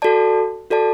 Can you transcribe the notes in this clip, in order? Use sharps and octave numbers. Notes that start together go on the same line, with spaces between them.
F#4 A4 D5 A5
F#4 A4 D5 A5